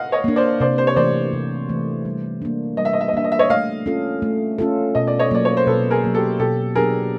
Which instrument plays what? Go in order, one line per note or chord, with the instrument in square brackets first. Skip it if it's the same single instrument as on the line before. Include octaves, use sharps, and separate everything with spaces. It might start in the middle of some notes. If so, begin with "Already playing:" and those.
Already playing: [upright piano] D#5 F5 F#5
C#5 D#5
[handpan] A#3 D4
[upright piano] C5 D5
[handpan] C3 [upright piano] C5 D5
[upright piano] C5
C#5
[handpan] E3 A3 [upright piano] C5 D5
[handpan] C3
E3 A3
G3
A#3 D4
[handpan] G3 [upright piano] D#5
[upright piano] E5
D#5
E5
D#5
[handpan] A#3 D4 [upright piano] E5
[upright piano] D#5
E5
C#5 D#5
[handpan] A3 [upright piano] D#5 F5
[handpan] C#4 F4 A4
A3
C#4 F4 A4
[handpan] B2 [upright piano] D#5
[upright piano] D5
C#5 D#5
[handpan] F#3 A#3 [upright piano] D5
[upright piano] C#5
C5
[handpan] B2 [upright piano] A4 B4
[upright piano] G#4 A#4
[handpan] F#3 A#3
[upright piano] G4 A4
[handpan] B2 [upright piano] G4 A4
[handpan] F#3 B3 D4 G4 [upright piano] G#4 A#4